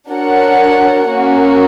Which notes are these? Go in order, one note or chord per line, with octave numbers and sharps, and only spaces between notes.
D4 F#4 A#4 C#5 F#5
A#3 C#4 F#4